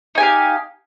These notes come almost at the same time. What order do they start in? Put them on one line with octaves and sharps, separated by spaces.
D#4 G#5 G4 F5